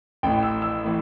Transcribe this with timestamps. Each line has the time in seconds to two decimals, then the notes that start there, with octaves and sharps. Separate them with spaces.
0.23 A1 A2 E3 G5
0.43 E6
0.62 E6
0.84 A2 E3